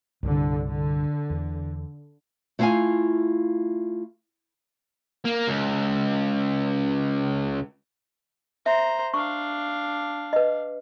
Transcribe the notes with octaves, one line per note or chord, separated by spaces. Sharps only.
C2 G2 D3
D3
E2
A3 E4 F4 D#5 F5 G#5
A#3
C#2
C5 E5 A#5
D4 F5 C#6
B4 D#5